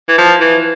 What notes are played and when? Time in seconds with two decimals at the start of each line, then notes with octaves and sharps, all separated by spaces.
0.08 E3
0.18 F3
0.40 E3